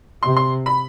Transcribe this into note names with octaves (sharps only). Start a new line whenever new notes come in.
C3 C6
C6
B5